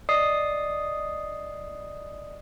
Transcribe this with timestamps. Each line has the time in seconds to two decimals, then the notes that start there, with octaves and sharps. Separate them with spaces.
0.09 D5 D#5 D#6 C7